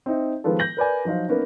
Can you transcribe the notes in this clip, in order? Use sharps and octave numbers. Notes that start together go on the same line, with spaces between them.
C4 D#4 E5
D#3 F3 G#3 B3 F4 A4
G6 A#6 F#7
A#4 B4 D5 G#5
F3 F#3 D#4 C5 F5
A#3 B3 C#4 D#4